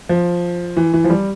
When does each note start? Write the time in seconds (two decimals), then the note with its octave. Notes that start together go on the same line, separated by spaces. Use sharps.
0.09 F3
0.77 E3
0.94 E3
1.04 F3
1.10 G3